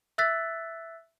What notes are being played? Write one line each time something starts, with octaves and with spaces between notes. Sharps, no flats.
E5 E6 F#6 A6 B6